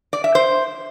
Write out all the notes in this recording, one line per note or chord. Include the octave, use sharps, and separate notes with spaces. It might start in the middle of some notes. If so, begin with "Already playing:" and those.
D5
E5
C5